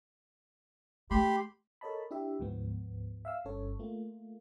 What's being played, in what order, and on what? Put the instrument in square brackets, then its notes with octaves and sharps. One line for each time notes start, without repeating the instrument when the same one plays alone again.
[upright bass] A3 [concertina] G4 B5 C6
[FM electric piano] A4 A#4 C#5 D#5 A5 B5
D4 E4 G4 E5
D2 G#2 F3 B3
E5 F5 E6
G1 G2 C#4 A4 C#5
A3 A#3 F4